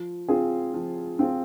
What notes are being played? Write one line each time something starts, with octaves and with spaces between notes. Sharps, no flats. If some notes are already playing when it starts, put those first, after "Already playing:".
Already playing: F3
C4 F4 G#4
F3
C4 F4 G#4